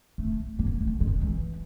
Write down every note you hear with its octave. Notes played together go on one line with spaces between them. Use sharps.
A3
A#3
A3
G#3
E3